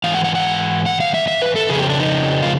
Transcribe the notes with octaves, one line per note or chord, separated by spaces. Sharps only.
G#2 E3 F5
F#5
F#5
F#5
F#5
F5
E5
E5
B4
A4
F2 C#3 G#4
G4
D4
D#4
F4